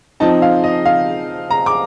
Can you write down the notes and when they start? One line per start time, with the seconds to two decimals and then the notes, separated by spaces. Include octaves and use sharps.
0.20 F3 C4 D#4 A5
0.42 F5
0.64 D#5
0.85 F5
1.50 A#5
1.66 D6